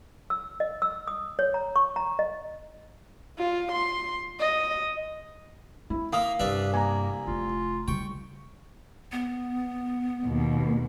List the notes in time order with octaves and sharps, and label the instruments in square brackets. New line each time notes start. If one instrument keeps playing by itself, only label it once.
[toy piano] E6
D#5
E6
D#6
C#5
A#5
C#6
A#5
D#5
[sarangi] F4
C6
D#5
[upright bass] C4 [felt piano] E4
[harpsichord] A#3 E5 [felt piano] F5 D#6
[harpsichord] C2 D4 E5 [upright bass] G2 [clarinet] B4
[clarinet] A#3 [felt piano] G#5 A#5
[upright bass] F1 [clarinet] F4
[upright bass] C#3 G3 [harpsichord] G5 [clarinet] C#6
[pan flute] B3
[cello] D#2 B2